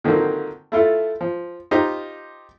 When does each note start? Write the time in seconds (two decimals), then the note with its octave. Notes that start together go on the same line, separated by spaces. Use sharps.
0.04 D3 D#3 F3 F#3 A#3 C4
0.72 A3 E4 F4 A4
1.21 F3
1.71 D#4 F4 G4 C5